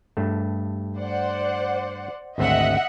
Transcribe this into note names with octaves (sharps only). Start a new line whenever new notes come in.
G2 A3
C5 D5 F#5
G#1 D2 C4 D#5 E5 F#5